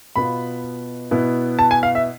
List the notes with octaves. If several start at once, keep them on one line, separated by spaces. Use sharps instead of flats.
B2 B3 F4 B5
B2 B3 E4
A5
G#5
F5
E5